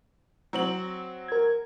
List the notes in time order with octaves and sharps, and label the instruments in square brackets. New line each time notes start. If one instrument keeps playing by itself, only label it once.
[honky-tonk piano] F#3 C4 F#7
[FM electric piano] A#4 G#6